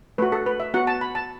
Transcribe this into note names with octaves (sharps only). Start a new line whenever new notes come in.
A3 F#4 B4
A4
B4
E5
B3 F#4 F#5
A5
B5
A5